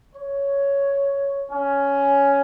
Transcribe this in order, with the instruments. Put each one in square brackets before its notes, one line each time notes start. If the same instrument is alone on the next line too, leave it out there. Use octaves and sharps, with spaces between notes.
[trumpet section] C#5
C#4